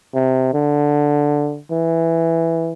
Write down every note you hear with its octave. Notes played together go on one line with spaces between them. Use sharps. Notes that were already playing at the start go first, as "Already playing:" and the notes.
C3
D3
E3